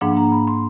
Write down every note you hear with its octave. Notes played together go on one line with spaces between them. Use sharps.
G#2 F3 A#3 D4 F#5
A#5
B5
C6